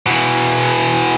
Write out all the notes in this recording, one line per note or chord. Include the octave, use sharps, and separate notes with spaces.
B2 E3